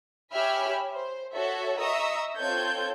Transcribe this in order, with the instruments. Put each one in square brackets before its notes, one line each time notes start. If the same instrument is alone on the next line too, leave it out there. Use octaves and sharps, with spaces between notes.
[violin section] G4 C#5 E5 G#5 B5 F6
C5
F#4 A4 C#5 E5
D#5 E5 A#5 C#6 D#6 E6
C4 F4 A4 C#5 G6 G#6